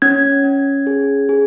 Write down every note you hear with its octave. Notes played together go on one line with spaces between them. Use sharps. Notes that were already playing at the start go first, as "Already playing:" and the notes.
C#4 G#6
C#4
G#4
G#4